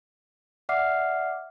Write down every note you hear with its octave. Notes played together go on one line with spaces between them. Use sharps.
D5 E5 F#5 D6 F6 C7